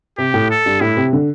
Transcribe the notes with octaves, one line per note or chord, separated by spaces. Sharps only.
C3 G4
A2
A4
G2
A2 E4
C3
D3